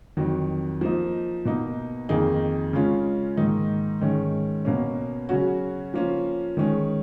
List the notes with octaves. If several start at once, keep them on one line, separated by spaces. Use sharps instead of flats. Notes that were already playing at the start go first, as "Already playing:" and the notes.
F2 D#3 F#3
F3 A#3 D#4
B2 A#3 D#4
F2 D#3 A#3 D#4 G#4
C#3 G#3 C#4 F4
G#2 D#3 A#3 D#4
G#2 D#3 G#3 C#4
B2 A#3 C#4
C#3 F#3 C#4 F#4
F3 A#3 C#4 F4
D#3 G#3 C#4 G#4